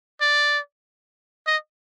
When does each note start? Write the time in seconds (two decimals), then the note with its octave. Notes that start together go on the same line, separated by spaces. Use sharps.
0.21 D5
1.47 D#5